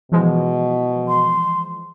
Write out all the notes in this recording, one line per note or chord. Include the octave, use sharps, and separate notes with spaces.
B2 E3 F3 G#3
C6